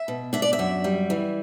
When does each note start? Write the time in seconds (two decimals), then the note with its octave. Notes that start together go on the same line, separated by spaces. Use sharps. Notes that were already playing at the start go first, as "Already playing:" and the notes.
Already playing: E5
0.08 B2
0.33 D4 E5
0.42 D5
0.53 E5
0.59 F#2
0.84 G3
1.10 E3